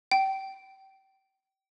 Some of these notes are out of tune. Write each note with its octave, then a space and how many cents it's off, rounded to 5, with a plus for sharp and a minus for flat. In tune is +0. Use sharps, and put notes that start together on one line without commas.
G5 -25